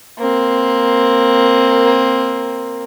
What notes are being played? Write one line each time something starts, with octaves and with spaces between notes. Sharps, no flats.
A#3 C4